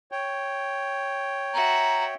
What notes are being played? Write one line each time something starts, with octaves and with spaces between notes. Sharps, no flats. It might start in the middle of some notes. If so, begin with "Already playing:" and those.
C#5 G5
F#4 E5 A#5